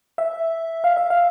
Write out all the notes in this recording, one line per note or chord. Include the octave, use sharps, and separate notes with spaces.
E5
F5
E5
F5